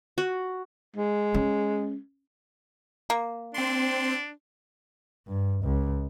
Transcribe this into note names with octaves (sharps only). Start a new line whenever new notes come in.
F#4
G#3
C#4
A#3
C4 D4 C6
G2
C#2